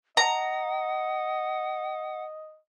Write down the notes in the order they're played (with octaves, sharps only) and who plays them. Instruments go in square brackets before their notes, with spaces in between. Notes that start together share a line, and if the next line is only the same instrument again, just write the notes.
[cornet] D#5 [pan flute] F#5 [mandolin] A#5